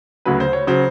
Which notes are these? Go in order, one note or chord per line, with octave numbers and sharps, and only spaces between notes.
D2 C#3 F#3 B4
C5
C#5
C#3 F#3 C5